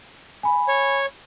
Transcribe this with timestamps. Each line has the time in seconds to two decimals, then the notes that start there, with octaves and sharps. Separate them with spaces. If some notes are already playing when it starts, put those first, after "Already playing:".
0.43 G#5 B5
0.68 C#5